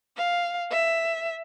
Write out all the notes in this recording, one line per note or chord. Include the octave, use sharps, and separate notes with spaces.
F5
E5